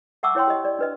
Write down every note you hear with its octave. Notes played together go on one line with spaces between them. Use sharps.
E5 F#5 A5 C#6 D6 E6
E4 C#5 G5 C6
G4 D#5
D5
D4 B4 D#5